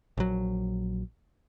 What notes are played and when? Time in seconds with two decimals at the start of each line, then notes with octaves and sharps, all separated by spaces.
0.18 A#1 F#3